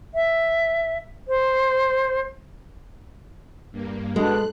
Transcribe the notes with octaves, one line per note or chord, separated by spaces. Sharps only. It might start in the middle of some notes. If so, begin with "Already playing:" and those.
E5
C5
G2 A#3
B2 G#3 D4 A4 F#6